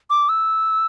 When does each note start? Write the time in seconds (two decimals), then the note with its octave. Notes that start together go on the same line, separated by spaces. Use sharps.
0.10 D6
0.29 E6